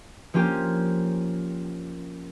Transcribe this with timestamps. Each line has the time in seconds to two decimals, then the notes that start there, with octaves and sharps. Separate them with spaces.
0.34 F3 A#3 C#4 F4 G4